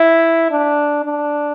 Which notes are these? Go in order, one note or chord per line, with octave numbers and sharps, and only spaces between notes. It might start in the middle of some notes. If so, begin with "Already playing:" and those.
Already playing: E4
D4
D4